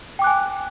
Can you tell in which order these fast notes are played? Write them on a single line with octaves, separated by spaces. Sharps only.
G5 D6 F#6 G#5